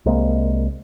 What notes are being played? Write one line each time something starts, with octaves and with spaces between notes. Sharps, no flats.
C2 C3 G#3 A#3